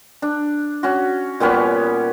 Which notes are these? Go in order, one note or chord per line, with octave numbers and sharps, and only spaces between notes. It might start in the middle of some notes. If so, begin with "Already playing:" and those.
D4
C#4 F#4
A#2 G3 B3 C#4